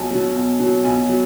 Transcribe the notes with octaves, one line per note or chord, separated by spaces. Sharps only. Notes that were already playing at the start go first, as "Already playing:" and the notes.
Already playing: B1 B2 F#3 G#5 A5
B2 F#3
B1
B2 F#3
B1 G#5
F#3